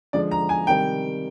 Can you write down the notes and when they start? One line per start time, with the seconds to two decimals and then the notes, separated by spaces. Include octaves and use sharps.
0.13 D3 F3 G#3 D5
0.31 A#5
0.49 G#5
0.67 C3 D#3 G3 G5